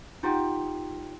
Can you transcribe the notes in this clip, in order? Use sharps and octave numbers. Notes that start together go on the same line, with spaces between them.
D#4 F4 G4 F#5